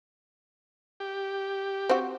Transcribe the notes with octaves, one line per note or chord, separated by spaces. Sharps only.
G4
C4 F#4